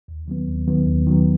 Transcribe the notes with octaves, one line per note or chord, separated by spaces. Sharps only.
D#2
D#3 F#3 B3
D#2
D#3 F#3 B3
D#2
D#3 F#3 B3